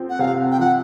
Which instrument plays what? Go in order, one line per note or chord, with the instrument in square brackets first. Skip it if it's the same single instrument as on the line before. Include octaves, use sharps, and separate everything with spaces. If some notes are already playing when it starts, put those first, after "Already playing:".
Already playing: [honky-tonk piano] F3 C4
[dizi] F#5
[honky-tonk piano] C3 [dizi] F5
[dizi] G5
[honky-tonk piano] F3 [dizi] F#5